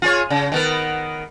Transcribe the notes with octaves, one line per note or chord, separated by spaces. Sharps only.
F4 G#4 C#5
C#3
D#3 B3 A#4